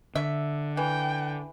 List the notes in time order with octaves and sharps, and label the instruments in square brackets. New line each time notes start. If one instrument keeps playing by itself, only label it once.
[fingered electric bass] D3 [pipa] E5
[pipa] E3 [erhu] G5